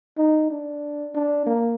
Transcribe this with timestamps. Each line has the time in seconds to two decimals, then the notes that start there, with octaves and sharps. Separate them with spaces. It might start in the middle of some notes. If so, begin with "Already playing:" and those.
0.18 D#4
0.50 D4
1.15 D4
1.46 A#3